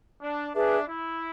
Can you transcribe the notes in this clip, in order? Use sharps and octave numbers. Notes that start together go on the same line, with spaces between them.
D4
D4 G#4 B4 E5
E4